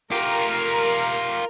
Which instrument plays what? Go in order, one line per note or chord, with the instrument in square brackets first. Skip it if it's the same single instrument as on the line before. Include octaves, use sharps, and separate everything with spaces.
[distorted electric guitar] F4 G4 [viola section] A#4